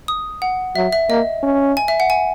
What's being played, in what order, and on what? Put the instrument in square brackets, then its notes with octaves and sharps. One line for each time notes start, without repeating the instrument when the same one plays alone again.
[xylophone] D#6
F#5
[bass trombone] F#3 [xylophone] E5
[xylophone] E5
[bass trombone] A#3 [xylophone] D#5
[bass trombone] C#4
[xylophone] G#5
E5
F#5
G#5